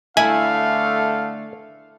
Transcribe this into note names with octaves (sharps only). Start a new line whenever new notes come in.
D3 A3 E4 F5 G#5